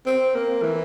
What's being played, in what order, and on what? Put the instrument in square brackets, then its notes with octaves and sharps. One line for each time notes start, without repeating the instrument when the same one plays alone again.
[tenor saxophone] C4
A#3
E3